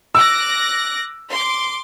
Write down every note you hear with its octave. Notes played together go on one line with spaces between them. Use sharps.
D6 E6 F#6 A#6
C6 D6